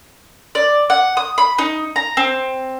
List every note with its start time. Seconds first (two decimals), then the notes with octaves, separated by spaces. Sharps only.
0.55 D5
0.90 F#5
1.17 D#6
1.38 B5
1.58 D#4
1.96 A#5
2.17 C4